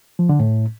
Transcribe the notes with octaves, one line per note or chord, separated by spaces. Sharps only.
F3
D3
A2